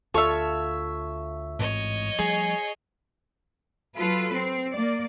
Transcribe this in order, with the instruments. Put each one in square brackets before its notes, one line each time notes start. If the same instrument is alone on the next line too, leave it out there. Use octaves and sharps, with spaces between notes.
[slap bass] D2 [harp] F4 A4 C#6 [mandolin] C#5 E5
[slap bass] A1 G#2 C4 [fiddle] C#5 D#5
[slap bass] F3 G3 A3 [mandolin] G#4
[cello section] F#3 F4 A4 B4
C4
A#3 D5